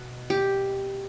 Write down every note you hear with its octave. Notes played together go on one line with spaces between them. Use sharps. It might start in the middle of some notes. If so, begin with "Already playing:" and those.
Already playing: B2
G4